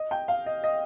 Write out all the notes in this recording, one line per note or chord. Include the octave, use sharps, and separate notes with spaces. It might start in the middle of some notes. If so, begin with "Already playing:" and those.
Already playing: D#5
G5
F5
D#5
D#5